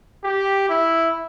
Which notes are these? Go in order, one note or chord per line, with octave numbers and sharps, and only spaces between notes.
G4
E4